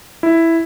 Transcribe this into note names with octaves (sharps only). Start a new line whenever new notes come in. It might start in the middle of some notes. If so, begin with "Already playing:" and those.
E4